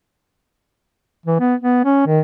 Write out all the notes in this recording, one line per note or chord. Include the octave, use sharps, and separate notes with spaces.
E3
B3
B3
C#4
D#3